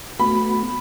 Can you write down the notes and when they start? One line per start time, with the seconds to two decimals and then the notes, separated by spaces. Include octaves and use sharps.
0.19 A3 B3 F#4 B5